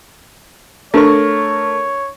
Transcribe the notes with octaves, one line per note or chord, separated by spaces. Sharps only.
A3 D4 A#4 C#5 C#6